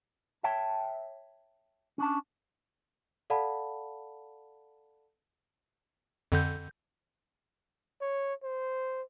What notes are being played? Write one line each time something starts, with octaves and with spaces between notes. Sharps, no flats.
C#5 E5 G5 A5
C#4 D4 A5
A4 D5 F5 F#5 A5 B5
F2 D3 G6
C#5
C5